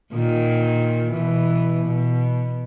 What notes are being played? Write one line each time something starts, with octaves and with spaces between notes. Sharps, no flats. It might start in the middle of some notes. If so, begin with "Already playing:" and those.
A#2 D#3
B2 E3
B2